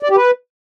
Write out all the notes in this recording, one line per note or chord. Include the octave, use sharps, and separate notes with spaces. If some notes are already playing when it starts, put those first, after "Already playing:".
D5
G4
B4